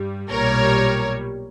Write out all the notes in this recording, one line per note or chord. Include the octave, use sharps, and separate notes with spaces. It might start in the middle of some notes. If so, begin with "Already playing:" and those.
Already playing: G2 G3
B1 A#2 G3 A#4 C#5